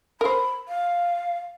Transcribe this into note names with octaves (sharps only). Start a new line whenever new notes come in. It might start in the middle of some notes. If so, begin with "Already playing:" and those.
A#4 C5 B5
F5